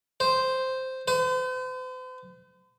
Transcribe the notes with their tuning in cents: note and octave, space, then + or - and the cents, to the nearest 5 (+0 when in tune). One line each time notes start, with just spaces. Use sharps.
C5 -5
C5 -45